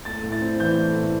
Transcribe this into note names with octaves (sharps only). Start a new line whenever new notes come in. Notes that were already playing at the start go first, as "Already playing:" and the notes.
A3 A6
A2
A6
C4
E3 G6
A3
A2